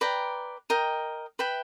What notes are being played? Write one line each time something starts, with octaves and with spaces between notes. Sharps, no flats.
B4 D5 G5 A#5
A#4 D#5 G5
B4 E5 G5 B5